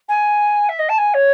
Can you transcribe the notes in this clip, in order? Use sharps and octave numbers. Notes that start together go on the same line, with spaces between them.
G#5
E5
D#5
A5
G#5
C#5